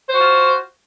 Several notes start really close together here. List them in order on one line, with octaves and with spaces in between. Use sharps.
C5 F#4 F4